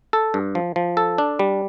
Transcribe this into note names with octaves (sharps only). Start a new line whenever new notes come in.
A4
G2
F3
F3
A4
D4
G3